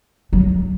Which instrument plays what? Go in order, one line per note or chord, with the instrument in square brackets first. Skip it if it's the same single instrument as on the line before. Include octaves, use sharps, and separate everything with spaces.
[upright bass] F#3